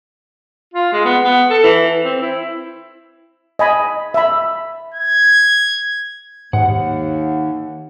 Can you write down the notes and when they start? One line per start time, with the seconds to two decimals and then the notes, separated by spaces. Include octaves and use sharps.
0.74 F4
0.93 G#3
1.05 B3
1.24 B3
1.50 A4
1.63 E3
2.04 C4
2.21 E4
3.59 D#5 G#5 B5
4.14 E5 B5
4.95 G#6
6.53 D#2 G#2 F#5